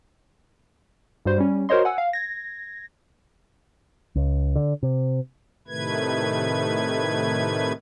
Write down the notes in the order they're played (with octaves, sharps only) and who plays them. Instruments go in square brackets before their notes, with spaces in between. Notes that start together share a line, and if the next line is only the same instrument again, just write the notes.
[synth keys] G2 G3 F#4 C5
G3 C#4
F#4 A#4 C5 C#5 D#5 C6
F#5 G#5 E6
F5
G#6 A#6
[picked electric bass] C#2
D3
C3
[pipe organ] A2 C3 D#3 A3 B4 G#6